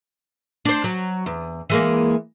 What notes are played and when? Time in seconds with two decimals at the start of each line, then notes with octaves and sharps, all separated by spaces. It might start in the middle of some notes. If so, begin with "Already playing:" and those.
0.65 D4 C5
0.84 F#3
1.26 E2
1.70 E3 G#3 A#3